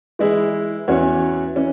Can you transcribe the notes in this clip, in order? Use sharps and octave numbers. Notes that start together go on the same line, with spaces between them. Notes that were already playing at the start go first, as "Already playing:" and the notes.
E3 G#3 E4 G#4 E5
E2 E3 C#4 F#4 C#5
E3 C#4